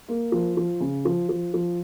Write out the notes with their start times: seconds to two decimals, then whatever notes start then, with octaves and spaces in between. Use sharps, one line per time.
0.09 A#3
0.32 F3
0.57 F3
0.80 C#3
1.05 F3
1.29 F3
1.54 F3